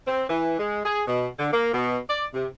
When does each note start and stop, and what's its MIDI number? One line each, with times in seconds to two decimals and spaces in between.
0.07 0.25 60
0.29 0.56 52
0.59 0.80 56
0.85 1.03 68
1.08 1.28 47
1.39 1.53 50
1.53 1.71 58
1.74 1.98 47
2.10 2.26 74
2.34 2.47 48